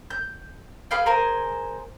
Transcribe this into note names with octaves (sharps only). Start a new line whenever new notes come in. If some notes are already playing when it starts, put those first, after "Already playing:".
G6
G#4 B4 F5 G5
G#4 A#4 C5 G#5